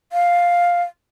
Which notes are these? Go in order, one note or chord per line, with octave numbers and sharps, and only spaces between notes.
F5